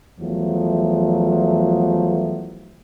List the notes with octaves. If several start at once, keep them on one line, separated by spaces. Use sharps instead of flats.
E2 F3 F#3 A3